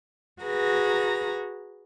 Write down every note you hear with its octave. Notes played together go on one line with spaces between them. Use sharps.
F#4 G#4 B4 A#5